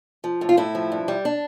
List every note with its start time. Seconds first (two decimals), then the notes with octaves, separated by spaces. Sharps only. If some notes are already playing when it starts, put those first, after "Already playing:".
0.24 F3
0.41 A2
0.49 F4
0.57 A2 E4
0.75 F3
0.92 G2
1.08 G3
1.25 D4